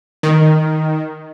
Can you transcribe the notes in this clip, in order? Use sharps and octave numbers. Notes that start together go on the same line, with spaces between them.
D#3